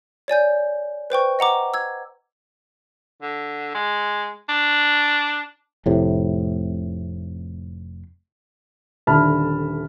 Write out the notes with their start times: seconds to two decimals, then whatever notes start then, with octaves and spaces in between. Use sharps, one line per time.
0.28 C#5 D5 G#5 G6
1.10 B4 C5 G5 C#6
1.39 D#5 F#5 A#5 D6
1.74 E6 G#6
3.22 D3
3.75 G#3
4.49 D4
5.86 F1 A2 C3
9.07 D#1 D3 E5 A5 B5 F6